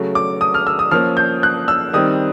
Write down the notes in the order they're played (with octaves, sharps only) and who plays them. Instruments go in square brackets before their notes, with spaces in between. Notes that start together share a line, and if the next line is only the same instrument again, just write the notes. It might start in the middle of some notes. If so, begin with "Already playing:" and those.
Already playing: [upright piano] C#3 F#3 A3
D6
D#6
F6
E6
D#6
F3 A#3 C#4 F6
G6
F#6
E6
D#3 G3 C4 D#6